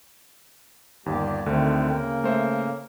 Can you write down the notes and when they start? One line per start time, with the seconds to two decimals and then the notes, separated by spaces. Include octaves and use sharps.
1.06 G1 D#2 G3 A#3 G4
1.46 D2 D3 D#3 A3 C4
1.90 C#3 A#3 A#4 G5
2.24 A3 C5 E5